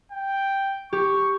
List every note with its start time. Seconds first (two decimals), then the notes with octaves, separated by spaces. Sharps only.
0.12 G5
0.93 G4 C#6